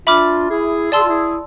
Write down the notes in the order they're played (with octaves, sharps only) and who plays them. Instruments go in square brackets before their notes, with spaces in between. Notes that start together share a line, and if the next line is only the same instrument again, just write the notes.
[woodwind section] D4 F4 [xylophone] E5 B5 D6 F6
[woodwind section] E4 G#4
[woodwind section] G#4 [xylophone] D5 A5 C6 E6
[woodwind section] F4
E4 G#4